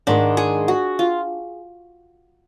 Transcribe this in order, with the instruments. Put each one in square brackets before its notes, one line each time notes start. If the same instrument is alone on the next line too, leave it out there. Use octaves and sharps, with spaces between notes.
[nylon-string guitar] G#2 D#3 G#3 [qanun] D4
[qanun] G#4
F#4
F4